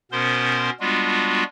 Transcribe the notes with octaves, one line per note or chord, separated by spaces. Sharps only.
B2 B3 C#4 A#4 C5 C6
G3 G#3 B3 D4 F4 F#4